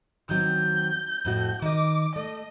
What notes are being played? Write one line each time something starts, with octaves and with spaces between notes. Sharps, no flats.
D#3 F#3 C4 G6
F2 A2 F#4
D#3 D#5 D6
A3 D#5